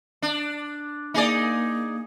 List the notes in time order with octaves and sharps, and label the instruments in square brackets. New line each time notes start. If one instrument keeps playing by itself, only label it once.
[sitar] D4
[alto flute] A#3 [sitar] D#4 G#4 D5